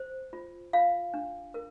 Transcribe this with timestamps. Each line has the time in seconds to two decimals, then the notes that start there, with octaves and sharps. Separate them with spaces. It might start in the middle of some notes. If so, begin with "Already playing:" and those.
Already playing: C5
0.33 F4
0.73 F4 F5
1.14 D4
1.54 A#4